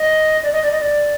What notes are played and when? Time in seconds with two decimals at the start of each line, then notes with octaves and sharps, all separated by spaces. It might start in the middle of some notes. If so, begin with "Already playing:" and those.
Already playing: D#5
0.43 D5
0.53 D#5
0.62 D5
0.71 D#5
0.80 D5